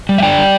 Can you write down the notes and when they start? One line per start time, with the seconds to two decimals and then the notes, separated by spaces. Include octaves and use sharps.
0.09 G3
0.18 E5
0.22 D3 D5 G5
0.38 G3